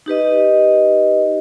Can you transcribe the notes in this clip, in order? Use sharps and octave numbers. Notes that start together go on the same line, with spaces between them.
D#4 G4 B4 D#5